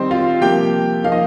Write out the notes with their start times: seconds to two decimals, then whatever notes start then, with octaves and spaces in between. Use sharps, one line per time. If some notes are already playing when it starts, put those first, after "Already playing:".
Already playing: D#3 G3 C4 D#4 C5
0.11 F4 F5
0.41 C3 F3 A#3 G4 G5
1.04 F3 A#3 D#4 F5
1.12 D#5